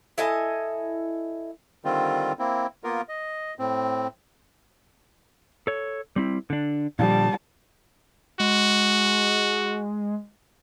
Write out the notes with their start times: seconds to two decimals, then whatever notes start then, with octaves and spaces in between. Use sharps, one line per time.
0.18 E4 A4 D#5 G#5
1.85 D3 D#3 G3 C4 F4
2.39 A#3 C4 E4
2.84 A#3 B3 F4 A#4
3.09 D#5
3.59 A2 C4
5.67 A4 C#5
6.16 G3 C4 E4
6.50 D3 D4
6.99 A#2 D3 F3 G3 A5
8.40 G#3 F#4